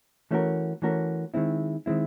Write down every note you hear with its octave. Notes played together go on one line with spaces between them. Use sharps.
E3 A3 C#4 F#4 A#4
E3 A3 C#4 F#4 A#4
D#3 G#3 C4 E4
D#3 G#3 C4 E4